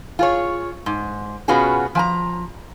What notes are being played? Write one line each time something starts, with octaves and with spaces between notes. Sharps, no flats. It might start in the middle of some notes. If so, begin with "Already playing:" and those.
F4 G#4 C#5
G#2
B2 B3 C#4 F4 F#4 G#4
F3 G#5 A#5